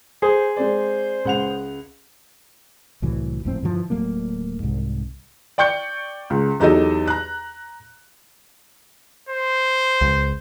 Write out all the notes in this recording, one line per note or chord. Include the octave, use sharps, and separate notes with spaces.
G#4 C5
G#3 C4 C5 D5
C#2 F#5 F7
C2 A2 E3 F#3
G1 F2 A2 C4
G2 D3 E3 F3
D1 F#3 A3 A#3
C2 G#2
D5 G5 C#6 G6 C#7
C#2
E2 F#3 D#4 G4 A4 D#5
A#5 F#6
C5
C#2